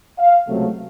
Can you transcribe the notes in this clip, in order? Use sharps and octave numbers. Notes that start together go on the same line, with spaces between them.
F5
C#2 C3 F#3 A3